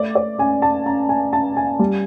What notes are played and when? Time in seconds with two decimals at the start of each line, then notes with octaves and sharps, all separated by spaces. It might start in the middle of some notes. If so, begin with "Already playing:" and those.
Already playing: A3 D5
0.15 D5
0.38 C#4 G#5
0.62 A5
0.86 C#4 A#5
1.09 G#5
1.33 C#4 A5
1.57 G#5
1.79 G3